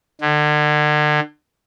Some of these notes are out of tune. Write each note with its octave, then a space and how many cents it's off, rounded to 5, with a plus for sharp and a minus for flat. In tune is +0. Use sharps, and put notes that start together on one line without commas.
D3 +35